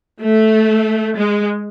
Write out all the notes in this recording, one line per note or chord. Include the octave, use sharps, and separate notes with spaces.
A3
G#3